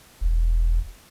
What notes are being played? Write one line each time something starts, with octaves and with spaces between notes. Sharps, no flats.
E1